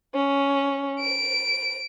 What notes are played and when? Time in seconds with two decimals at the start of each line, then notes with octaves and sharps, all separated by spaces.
0.14 C#4
0.99 D7